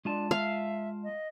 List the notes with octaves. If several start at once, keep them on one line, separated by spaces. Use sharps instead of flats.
G#3 D4 F4 A5
E5 F5
D#5